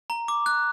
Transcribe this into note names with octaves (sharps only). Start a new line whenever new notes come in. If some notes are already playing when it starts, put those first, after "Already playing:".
A#5
D6
F#6